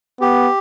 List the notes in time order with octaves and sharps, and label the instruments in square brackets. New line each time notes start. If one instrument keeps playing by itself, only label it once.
[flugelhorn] B3 [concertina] G4